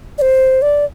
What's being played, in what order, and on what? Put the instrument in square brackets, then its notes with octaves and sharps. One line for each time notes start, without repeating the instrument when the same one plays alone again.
[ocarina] D5
C5
D5